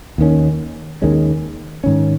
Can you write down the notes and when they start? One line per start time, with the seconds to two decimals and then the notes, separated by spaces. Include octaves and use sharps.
0.18 D#2 D#3 C#4
1.02 D#2 D#3 G#3 C#4
1.84 G#2 D#3 C#4